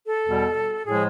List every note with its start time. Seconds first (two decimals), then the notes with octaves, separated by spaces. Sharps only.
0.09 A4
0.25 E2 B2 G3
0.87 A2 F3 G#3 G#4